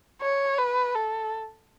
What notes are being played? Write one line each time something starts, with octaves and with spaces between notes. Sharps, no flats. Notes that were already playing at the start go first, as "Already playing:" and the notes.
C#5
B4
A4